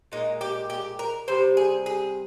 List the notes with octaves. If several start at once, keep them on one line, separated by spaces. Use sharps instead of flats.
A#2 G#3 D#4
G4
G4
A#4
C3 G3 C5
G#4
G#4